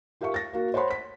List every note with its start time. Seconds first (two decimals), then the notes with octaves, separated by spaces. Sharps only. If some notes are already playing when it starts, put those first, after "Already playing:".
0.21 F4 G4 A#4 E5 F5 C#6
0.34 A6 A#6
0.53 A#3 F#4
0.74 C5 C#5 F#5 B5 C6
0.90 B6